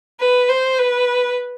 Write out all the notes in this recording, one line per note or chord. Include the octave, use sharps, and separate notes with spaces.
B4
C5
B4